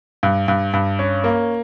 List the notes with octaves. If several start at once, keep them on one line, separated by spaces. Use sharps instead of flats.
G2
G2
G2
C#4
A#3